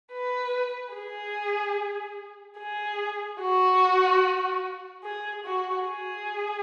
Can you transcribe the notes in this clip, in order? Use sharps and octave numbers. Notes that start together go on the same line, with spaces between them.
B4
G#4
G#4
F#4
G#4
F#4
G#4